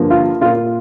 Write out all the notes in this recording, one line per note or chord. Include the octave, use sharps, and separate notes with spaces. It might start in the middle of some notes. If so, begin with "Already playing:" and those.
Already playing: G2 D3 F3 A#3
F4
A#2 A#3 F4